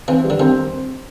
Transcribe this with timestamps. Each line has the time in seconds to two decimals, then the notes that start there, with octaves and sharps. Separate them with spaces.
0.08 E3 C4
0.24 G3
0.30 D3
0.40 D#3 C4